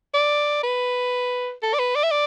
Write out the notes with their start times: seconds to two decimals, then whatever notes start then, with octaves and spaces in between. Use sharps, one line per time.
0.14 D5
0.63 B4
1.62 A4
1.74 D5
1.79 B4
1.95 D5
2.03 E5
2.11 D5